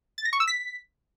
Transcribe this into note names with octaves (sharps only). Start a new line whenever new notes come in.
A6
A#6
C#6
E6
B6